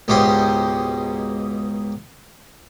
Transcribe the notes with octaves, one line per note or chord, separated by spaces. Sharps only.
C#2 G#2 B2 G4 C5 G5